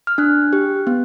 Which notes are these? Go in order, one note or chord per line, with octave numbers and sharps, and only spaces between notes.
F6
D4 F#6
G4
B3